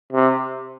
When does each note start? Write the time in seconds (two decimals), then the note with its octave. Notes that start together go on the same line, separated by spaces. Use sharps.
0.13 C3